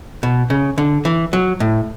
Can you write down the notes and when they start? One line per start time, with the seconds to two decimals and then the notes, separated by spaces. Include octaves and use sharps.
0.23 B2
0.50 C#3
0.78 D3
1.05 E3
1.33 F#3
1.60 A2